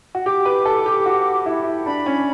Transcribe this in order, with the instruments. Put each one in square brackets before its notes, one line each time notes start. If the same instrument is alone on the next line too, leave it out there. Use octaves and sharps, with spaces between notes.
[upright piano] F#4
[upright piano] G4 [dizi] D6
[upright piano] B4
A4
G4
F#4
E4
[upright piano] D4 [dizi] B5
[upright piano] C#4